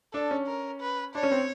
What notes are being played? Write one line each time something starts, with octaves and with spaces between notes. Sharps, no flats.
D4 A4
C#4
A#4
B4
D4 C#5
C#4
C4